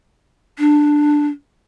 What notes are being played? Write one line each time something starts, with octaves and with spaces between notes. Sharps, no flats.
D4